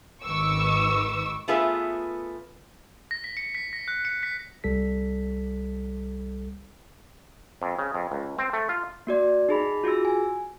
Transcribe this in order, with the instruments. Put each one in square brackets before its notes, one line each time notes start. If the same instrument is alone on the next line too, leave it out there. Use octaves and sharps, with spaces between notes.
[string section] G#1 D#3 B4 C#6 D6 E6
[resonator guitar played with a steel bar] A3 B3 F4 G#4 B4 E5
[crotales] A#6
B6
C#7
B6
A#6
F#6
C#7
B6
[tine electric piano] C2 G3 A4 B6
[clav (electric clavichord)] F2
C#3
F2
C#2
C4
A3
F4
[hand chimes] A#3 F#4 D5
D#4 G#4 B5
F4 F#4 G#4 E6
G#5